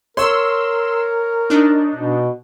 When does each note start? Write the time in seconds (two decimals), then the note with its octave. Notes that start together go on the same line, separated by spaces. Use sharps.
0.17 A#4 C#5 C6 E6
1.50 D4 D#4
1.95 B2